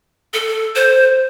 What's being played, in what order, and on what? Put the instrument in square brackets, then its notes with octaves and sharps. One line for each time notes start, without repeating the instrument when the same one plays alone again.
[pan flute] A4
C5